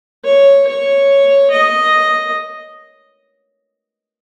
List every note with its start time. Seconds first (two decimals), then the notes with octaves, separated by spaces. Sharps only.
0.24 C#5
0.67 C#5
1.51 D#5